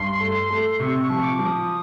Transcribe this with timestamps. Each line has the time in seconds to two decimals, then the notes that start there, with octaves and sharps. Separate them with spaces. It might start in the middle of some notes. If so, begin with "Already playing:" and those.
Already playing: G2 C6
0.20 A3
0.50 A3
0.79 C3 C#6
1.02 C#6
1.09 F3
1.23 D6
1.39 F3
1.46 D#6